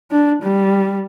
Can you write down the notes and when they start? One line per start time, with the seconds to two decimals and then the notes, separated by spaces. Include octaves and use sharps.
0.11 D4
0.42 G3